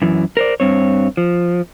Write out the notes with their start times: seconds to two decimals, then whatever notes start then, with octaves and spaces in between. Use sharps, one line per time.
0.02 F#2 E3
0.37 A#4 C5 D5
0.60 G2 C4 C#5
1.17 F3